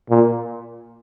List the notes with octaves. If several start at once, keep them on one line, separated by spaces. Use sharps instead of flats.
A#2